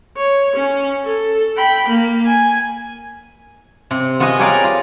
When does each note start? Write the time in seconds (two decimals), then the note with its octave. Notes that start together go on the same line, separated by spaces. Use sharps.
0.17 C#5
0.56 C#4
1.04 A4
1.58 G5 B5
1.89 A#3
2.24 G#5
3.91 C3
4.20 B3 F4 F#4 G#4 D#5
4.39 G4 G#4 A#4 C#5 D5 F5
4.64 F4